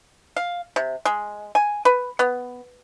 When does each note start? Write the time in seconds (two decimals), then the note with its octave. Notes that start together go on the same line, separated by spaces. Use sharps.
0.36 F5
0.76 C3
1.05 G#3
1.55 G#5
1.85 B4
2.19 B3